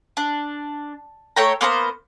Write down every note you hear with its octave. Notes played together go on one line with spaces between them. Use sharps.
D4
A3 C#5 G5 A#5
A#3 B3 C5 A#5